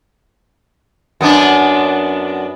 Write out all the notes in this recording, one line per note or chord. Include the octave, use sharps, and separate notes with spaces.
F#2 B3 D4